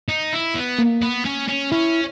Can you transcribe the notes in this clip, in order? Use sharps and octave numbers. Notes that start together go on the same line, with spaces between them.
D#4
E4
B3
A#3
B3
C#4
C#4
C#4 E4